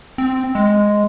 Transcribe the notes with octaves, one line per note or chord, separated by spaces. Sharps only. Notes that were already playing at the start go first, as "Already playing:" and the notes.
C4
G#3